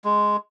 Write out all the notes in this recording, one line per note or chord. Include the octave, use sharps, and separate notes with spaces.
G#3